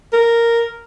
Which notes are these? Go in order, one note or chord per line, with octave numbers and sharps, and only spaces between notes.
A#4